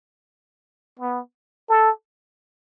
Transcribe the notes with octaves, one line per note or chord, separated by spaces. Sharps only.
B3
A4